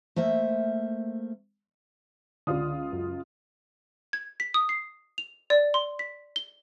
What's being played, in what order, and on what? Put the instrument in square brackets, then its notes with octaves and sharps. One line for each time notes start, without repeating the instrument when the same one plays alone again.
[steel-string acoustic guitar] A3 A#3 C5 E5
[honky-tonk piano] C#2 F4 D#6 [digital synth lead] D3
[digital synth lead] F#2
[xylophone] G#6
B6
D#6
C7
F7
D5
C6
B6
G7